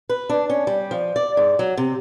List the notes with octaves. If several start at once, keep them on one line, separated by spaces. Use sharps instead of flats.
B4
D4
C#4
G3
F3
D5
G#2
F#3
C3